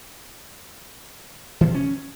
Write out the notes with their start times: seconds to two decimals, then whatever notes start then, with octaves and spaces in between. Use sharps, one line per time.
1.61 E3
1.68 C3
1.75 C#4